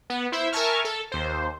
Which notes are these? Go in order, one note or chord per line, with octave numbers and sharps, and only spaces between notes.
B3
E4 C5 E5
A#4 E5 G#5 A5 C#6 F6
A4
D#2 C5